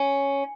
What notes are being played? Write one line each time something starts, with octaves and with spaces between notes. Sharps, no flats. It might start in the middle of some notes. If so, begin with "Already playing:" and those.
Already playing: C#4